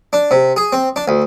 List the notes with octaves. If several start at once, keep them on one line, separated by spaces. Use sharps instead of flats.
D4
C3
G#4
C4
D4
D2